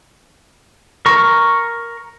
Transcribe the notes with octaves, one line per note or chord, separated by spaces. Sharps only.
A#4 C#6